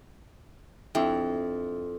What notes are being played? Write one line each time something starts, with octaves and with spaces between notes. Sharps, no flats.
F2 D4 E4 G5